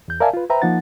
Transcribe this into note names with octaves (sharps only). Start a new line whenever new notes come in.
E2 G6
A#4 D5 E5 F5 G#5 A5
F4 B4
B4 C5 E5 G5 A#5
F3 A#3 D#4 F#5 A6